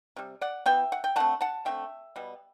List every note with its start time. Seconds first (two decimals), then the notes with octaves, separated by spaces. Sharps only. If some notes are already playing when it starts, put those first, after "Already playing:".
0.16 C3 G3
0.41 D5 F#5
0.66 E3 B3 E5 G5
0.92 F#5
1.04 G5
1.16 D3 A3 C4 F#5 A5
1.41 F#5 A5
1.65 D3 A3 C4 E5 G5
2.16 B2 G3 B3